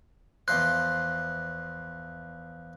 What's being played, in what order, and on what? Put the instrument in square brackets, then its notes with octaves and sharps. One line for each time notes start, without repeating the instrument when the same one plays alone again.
[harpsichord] E2 F3 C5 [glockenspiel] F#6